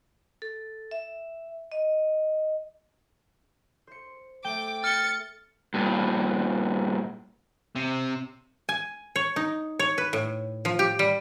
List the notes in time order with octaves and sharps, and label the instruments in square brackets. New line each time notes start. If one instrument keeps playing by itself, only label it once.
[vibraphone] A4
E5
D#5
[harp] C5 C#7
[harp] A3 D#7 E7 [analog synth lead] G5 [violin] D6
[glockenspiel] F6 G7 [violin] A6 C#7
[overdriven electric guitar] G2 A#2
C3
[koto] G#5
C#5
D#4
C#5
B4
A2
F3
G4
G3